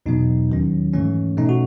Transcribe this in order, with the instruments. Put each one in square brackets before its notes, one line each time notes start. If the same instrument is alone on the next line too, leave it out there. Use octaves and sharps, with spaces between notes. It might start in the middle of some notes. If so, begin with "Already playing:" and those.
[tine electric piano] E2 B2 F#3 B3 D#4
D#2 D#3 F#3 C#4
G#2 E3 A3 C#4
B2 A3 C#4 D#4
F#4